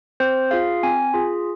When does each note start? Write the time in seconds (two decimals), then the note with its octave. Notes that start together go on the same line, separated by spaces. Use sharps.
0.20 C4 C5
0.51 F4 G#4 F5
0.83 C4 G#5
1.14 F4 G#4